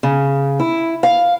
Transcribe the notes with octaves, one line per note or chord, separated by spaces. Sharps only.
C#3
E4
F5